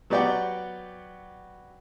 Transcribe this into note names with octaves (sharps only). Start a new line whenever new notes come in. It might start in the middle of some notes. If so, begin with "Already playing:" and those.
F#3 B3 G4 D5 F#5 G5